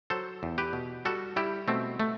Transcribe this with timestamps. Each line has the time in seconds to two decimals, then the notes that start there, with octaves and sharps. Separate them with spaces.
0.10 F#3 A4 C5
0.43 E2
0.58 G4 B4
0.73 B2
1.05 G3 F#4 A4
1.36 G3 E4 G4
1.68 B2 A3 C4
2.00 A3